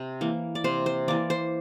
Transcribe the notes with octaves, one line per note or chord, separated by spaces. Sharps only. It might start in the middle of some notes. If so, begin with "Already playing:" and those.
Already playing: C3
E3 A#3
D5
C3 C5
C5
E3 A#3 D5
C5